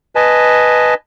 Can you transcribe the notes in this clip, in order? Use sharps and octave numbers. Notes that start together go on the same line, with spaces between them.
B4 D#5 G#5 A5